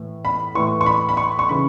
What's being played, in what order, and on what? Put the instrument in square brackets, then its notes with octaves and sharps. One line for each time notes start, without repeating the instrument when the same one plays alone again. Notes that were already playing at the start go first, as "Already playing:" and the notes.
Already playing: [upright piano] A2 E3
B5
A2 E3 C#6
C#6
B5
B5
C#6
C#6
C#3 E3 B5